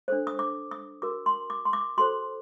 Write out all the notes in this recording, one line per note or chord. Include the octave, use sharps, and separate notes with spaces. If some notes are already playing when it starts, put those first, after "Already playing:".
D4 A4 C5
D#6
D6
D#6
F#4 A#4 D6
C6
D6
C6
D6
F#4 A4 C5 C6